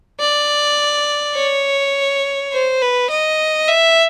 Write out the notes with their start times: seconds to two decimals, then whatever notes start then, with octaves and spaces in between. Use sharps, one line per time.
0.19 D5
1.35 C#5
2.52 C5
2.81 B4
3.10 D#5
3.68 E5